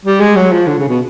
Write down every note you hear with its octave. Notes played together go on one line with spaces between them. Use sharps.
G3
G#3
F#3
F3
D3
C#3
B2